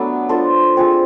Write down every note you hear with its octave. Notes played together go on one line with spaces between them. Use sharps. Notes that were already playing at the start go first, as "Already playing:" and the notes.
Already playing: F#3 A3 B3 D4 E4 F#4
D4 F4 A4 C5
C4 F4 G#4 C5